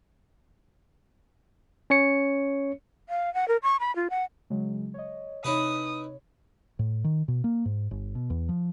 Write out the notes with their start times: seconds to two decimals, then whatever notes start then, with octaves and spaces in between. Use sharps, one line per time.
1.90 C#4 C#5 C#7
3.09 F5
3.34 F#5
3.48 A#4
3.63 C#6
3.80 B5
3.96 F4
4.10 F#5
4.50 C#3 F#3 G#3
4.94 C#5 D#5
5.44 C3 D#4 E4 B4 C#5 D#6
6.79 A2
7.04 D#3
7.28 B2
7.44 A#3
7.65 G#2
7.91 G1
8.15 B2
8.30 E2
8.49 F3